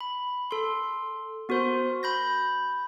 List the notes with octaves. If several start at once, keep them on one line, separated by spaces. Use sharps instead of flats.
B5
A4 C6
B3 F#4 A#4 C5 C6
B5 G6 A#6